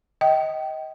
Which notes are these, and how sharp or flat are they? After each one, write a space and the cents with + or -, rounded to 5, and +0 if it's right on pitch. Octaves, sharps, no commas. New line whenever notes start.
D#5 +20 G5 -20